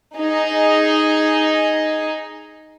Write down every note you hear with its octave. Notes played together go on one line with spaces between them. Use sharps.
D#4 G#4